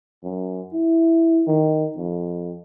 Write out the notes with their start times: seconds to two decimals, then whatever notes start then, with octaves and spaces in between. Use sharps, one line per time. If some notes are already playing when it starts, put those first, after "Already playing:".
0.23 F#2
0.73 E4
1.47 D#3
1.97 F2